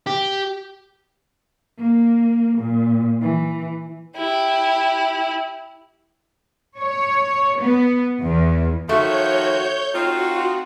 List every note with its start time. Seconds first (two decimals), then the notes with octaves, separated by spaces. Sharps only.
0.07 G4
1.78 A#3
2.58 A#2
3.22 E3
4.17 E4 G4
6.79 C#5
7.59 B3
8.21 E2
8.89 D#3 F3 A3 F#4 C#5 G6
9.95 C4 D#4 F4 F#4